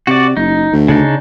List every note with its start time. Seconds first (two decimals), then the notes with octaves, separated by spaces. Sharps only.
0.07 C3 F#4 D5
0.37 F#1 D#4
0.72 D2
0.88 C#3 D4 D#4